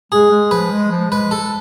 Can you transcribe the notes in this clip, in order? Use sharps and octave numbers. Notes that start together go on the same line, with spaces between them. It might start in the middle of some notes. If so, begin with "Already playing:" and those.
G#3 G#4
G#3
F3 B4
G#3
F3
G#3 B4
A4